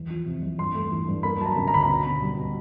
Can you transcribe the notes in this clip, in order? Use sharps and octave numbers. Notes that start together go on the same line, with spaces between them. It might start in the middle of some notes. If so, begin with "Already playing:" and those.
Already playing: E2
F3
C3
E2
G2 C6
A3
E3
G2
A#3 B5
F#3 A5
A#5
C#3
A#5
D2 B5
A#5
B2
B3
G3
B2